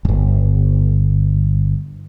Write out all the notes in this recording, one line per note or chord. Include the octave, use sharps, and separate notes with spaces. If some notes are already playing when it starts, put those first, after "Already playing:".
D1 G1